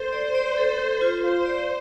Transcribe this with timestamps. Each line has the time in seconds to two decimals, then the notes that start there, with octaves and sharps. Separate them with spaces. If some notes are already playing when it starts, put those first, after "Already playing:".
Already playing: A4 C5
0.13 D5
0.35 D5
0.57 A4
0.80 A4
1.01 F4
1.24 C5 F5
1.46 D5